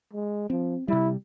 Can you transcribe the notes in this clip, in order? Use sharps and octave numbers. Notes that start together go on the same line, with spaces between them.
G#3
F3 C4
C3 G3 E4